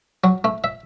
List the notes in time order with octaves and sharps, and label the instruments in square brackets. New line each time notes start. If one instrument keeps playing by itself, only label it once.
[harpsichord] F#3
A3
E5